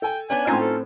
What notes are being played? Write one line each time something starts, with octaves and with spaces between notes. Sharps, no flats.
A4 G5 G#5
B3 C#4 D4 B4 G#5
A2 C4 C#4 D#4 F4 C5
A4